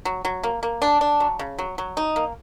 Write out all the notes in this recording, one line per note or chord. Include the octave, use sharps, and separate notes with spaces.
F#3
F#3
A#3
A#3
D4
D4
F#3
C#3
F#3
F#3
D#4
A#3